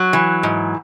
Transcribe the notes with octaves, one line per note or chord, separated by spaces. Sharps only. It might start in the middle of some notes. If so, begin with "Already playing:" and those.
Already playing: F#3
E3
G#2